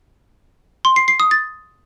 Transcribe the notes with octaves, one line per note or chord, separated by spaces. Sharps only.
C6
C7
C7
D#6
A6